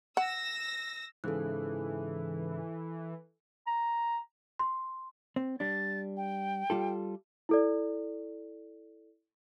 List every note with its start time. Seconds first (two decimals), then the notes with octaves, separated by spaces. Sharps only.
0.17 F#5 E6 A#6
1.24 G#2 C#3 E3 A4 F#6
3.67 A#5
4.59 C6
5.36 C4
5.60 G3 D4 A6
6.17 G5
6.70 G3 F4 A4
7.49 E4 A4 D5